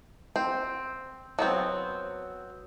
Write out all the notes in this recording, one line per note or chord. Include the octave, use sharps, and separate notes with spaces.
C4
F#3 B3 C4